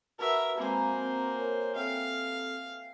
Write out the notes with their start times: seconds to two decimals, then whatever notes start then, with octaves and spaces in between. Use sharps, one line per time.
0.19 F#4 A#4 B4 E5 A5
0.57 G#3 A#3 C4 C5 F5 G#5 A#5 B5
0.98 C4
1.38 A#4 C#5
1.75 C4 A4 E5 F5 G5